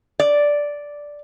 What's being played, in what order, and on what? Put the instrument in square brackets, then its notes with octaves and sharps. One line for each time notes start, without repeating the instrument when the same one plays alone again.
[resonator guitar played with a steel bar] D5